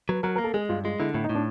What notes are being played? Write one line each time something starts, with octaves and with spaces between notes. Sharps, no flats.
F#3 B4
F#3 A#4
A#3 A#4
A4
G#3 G#4
G2 F4
G#3 F4
D3 E4
A2 E4
D#4
A2
D4